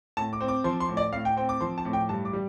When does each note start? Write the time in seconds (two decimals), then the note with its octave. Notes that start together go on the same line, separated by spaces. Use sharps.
0.17 A2 A5
0.33 D6
0.41 C4
0.48 D6
0.64 F3 C6
0.80 C6
0.89 A2
0.97 D5
1.12 A2 F5
1.25 G5
1.37 C4 G5
1.49 D6
1.61 F3 C6
1.78 A5
1.85 A2
1.93 G5
2.09 G2 A5
2.25 D6
2.33 G3